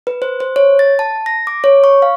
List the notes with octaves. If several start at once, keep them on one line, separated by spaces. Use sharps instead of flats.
B4
C5
C5
C#5
A6
A5
A#6
D6
C#5
C#6
F5